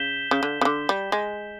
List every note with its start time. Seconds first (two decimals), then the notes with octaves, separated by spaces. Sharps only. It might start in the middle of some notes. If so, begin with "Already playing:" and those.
Already playing: C#3 G6 B6 E7 G7
0.31 C#3
0.43 D3
0.61 C#3
0.65 D3
0.89 G3
1.12 G#3